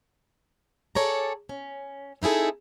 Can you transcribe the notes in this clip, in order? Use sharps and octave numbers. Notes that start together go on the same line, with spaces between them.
G#4 A4 C#5 D5 A#5
C#4
C4 D#4 E4 G#4 A4